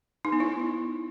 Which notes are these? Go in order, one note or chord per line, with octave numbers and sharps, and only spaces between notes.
D#4
B3
E4